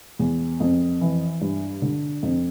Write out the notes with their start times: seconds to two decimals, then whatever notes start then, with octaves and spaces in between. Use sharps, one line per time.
0.19 E2
0.60 F2
1.01 E3
1.41 G2
1.82 D3
2.23 F2